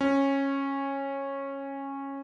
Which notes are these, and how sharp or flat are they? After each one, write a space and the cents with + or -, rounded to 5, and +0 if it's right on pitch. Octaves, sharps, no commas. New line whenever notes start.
C#4 -15